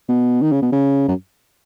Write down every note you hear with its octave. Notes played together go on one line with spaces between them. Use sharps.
B2
D#3
C#3
B2
C#3
F#2